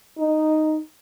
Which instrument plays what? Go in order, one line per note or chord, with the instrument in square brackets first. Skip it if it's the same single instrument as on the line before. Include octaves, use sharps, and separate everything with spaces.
[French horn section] D#4